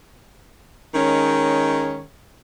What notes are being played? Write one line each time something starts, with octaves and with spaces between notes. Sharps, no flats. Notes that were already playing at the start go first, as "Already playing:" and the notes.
D#3 G#3 C#4 C#5